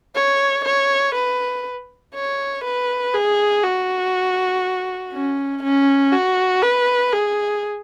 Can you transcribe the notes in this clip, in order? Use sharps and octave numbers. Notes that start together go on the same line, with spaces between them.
C#5
C#5
B4
C#5
B4
G#4
F#4
C#4
C#4
F#4
B4
G#4